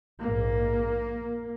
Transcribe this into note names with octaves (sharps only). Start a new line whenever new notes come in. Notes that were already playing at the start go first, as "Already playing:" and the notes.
A#1 G#2 A#3